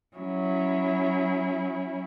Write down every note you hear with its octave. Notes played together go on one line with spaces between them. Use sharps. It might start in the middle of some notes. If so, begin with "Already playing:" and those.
F#3 C#4 E4